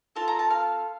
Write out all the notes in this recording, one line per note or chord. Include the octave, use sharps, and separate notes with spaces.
C4 F4 A4 A5
A#5
A5
F5